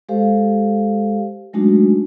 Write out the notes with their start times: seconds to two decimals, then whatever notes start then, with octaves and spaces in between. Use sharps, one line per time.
0.09 G#3 G4 A4 C5 F5
1.53 F#3 G#3 A3 D4 D#4 F#4